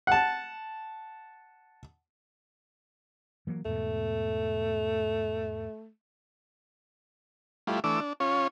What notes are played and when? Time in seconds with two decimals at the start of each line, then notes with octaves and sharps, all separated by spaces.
0.07 F#5 A5
3.47 E3 F#3 A#3
3.65 E2 G#2 B2 A3
7.67 G3 A3 E4 F4
7.84 E3 A3 D4 D6 E6
8.00 D4
8.20 C#4 F4 C#5